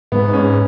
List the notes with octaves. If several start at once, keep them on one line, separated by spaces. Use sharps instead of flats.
G#2 B3
C#4